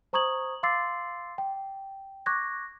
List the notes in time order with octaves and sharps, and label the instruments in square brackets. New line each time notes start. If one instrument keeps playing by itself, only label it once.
[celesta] C5 A#5 C#6 D#6 G#6 F#7
F5 C6 D6 E6 A6 C7
G5
C#6 D6 F#6 G#6 A#6